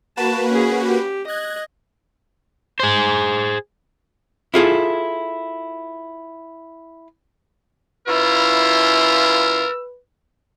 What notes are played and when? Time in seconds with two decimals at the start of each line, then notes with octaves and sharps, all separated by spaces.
0.17 A#3 F#4 B4 A5
0.50 C#4 G#4
0.86 G4
1.28 D#5 F#6 G#6
2.80 G#4 C5
4.54 E4 F4 G#4 A4
8.07 F#2 E4 F4 A#4 B4 E6